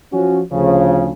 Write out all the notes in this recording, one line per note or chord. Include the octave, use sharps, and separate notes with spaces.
F3 C#4 F#4
D2 C#3 F3